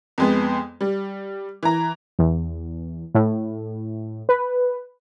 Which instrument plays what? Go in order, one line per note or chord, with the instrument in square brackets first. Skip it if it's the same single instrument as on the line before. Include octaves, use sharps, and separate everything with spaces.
[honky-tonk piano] F2 G#3 B3
G3
E3 A#5
[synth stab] E2
A2
B4